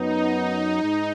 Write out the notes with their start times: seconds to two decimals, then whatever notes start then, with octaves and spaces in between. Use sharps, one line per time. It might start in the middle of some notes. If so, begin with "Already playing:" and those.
Already playing: F#2 F#3 B3 D#4
0.82 G#2 G#3